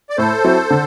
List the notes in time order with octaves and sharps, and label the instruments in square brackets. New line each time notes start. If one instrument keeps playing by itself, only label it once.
[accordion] D5
[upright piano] A2 [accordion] A4 C5
[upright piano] F#3 C4 E4
D3